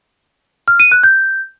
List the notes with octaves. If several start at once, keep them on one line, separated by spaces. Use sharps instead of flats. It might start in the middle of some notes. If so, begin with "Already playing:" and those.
F6
D#7
F#6
G6